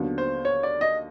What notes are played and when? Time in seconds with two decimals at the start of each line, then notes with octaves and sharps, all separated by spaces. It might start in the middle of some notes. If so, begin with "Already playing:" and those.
Already playing: D#2 D3 F#3 B3
0.18 C5
0.45 C#5
0.63 D5
0.81 D#5